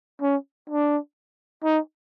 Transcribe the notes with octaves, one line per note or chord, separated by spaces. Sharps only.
C#4
D4
D#4